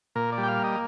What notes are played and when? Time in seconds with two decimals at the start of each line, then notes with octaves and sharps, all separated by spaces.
0.15 A#2 A#4
0.32 D5
0.38 G3
0.43 G5
0.48 F5
0.59 A#3
0.64 D#5